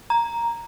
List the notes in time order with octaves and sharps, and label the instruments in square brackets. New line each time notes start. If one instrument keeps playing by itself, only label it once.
[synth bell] A#5